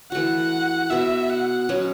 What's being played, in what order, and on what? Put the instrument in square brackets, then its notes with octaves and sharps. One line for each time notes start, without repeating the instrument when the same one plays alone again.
[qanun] E3 A3 F#4 [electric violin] F#5
[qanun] B2 B3 F#4 [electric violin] E5
[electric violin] F#5
[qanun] B2 F#3 C#4